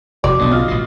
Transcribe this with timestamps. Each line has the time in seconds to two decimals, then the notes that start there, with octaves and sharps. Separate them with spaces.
0.24 F1 F#4 D5 D6
0.39 B1 G#2 B2 D4 D#6
0.51 C#3 F4 D#5
0.68 A1 B2